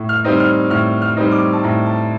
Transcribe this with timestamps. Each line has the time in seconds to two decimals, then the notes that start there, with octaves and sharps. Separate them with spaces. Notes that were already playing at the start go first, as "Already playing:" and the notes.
Already playing: A2
0.09 F6
0.25 G3 C4 D#4
0.40 F6
0.70 A2 F6
1.02 F6
1.17 G3 C4 D#4
1.32 D6
1.53 A5
1.64 A2 A#5
1.86 A5